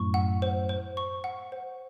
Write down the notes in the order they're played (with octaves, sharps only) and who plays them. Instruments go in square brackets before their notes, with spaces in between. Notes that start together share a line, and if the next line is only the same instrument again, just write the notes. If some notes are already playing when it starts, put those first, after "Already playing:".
Already playing: [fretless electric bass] F#2 A2 [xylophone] C#6
[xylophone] F#5
C5
C5
C#6
F#5
C5